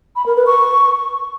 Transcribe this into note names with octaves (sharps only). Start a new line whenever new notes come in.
B5
A#4
B4
C#6